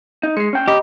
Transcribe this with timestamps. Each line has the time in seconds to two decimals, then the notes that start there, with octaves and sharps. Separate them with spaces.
0.23 D#4
0.37 G#3 C7 C#7
0.53 C#4 G5
0.68 G4 D#5 A#5 B5